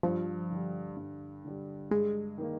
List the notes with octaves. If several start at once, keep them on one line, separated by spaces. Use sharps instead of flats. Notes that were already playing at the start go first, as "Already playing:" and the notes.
G2 F3
D3 G3
G2
D3 G3
G2 G#3
D#3 A#3